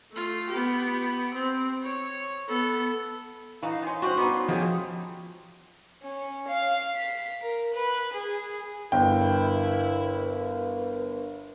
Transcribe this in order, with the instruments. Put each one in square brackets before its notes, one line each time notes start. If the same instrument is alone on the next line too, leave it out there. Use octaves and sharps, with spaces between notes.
[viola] A3 F4
B3 G4
C4
C#5
B3 A4
[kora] E3 [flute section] D#4 F5 [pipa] F#4 B4
[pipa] D#3 C#4 [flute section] C6
[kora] C#4 F#4 [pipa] D4 G4 C5
[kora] B3 [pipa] D#4 D5
[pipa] D#3 C#4 [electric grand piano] F3 [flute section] G4 G#4
[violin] C#4
F5
B6
A#4
B4
G#4
[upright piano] G1 [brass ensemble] E4 [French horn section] A#4 B4 [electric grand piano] G5